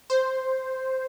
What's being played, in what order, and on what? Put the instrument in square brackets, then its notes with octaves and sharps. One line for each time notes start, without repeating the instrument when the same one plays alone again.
[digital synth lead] C5